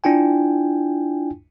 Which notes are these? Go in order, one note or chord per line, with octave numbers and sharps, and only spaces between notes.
D4 E4 F4 G5 G#5